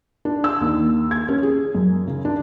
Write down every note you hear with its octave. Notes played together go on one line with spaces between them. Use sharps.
D4
E6
D#2
G#6
C#4
G#4
F#2
C#3
D4